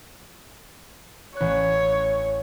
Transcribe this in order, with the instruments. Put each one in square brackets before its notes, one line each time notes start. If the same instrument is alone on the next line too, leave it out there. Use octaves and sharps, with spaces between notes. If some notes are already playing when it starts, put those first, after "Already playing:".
[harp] A1 F#6 [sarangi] C#5